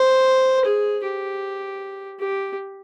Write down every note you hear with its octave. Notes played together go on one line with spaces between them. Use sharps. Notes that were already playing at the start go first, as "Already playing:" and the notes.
Already playing: C5
G#4
G4
G4